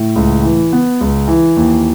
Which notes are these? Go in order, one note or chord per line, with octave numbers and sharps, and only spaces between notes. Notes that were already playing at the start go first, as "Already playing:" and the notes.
Already playing: A2
C#2
E3
B3
C#2
E3
D#2